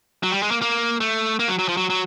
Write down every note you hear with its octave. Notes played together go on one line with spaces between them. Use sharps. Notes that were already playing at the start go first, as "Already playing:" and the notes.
F#3
G3
G#3
A#3
A#3
A3
A#3
F#3
F#3
F3
F#3
F#3